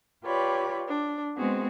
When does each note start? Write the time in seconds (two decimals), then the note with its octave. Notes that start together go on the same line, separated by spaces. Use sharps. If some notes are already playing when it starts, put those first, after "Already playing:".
0.24 F4 G4 B4 C#5 D5 B5
0.87 D4
1.36 G#3 B3 C4 F#4 G#4